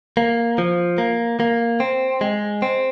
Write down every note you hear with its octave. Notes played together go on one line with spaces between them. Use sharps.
A#3
F3
A#3
A#3
C4
G#3
C4